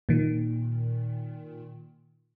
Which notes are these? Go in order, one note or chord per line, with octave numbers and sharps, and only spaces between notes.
A#2 D#3